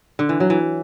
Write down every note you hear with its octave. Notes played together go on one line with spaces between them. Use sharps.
D3
E3
F#3
E3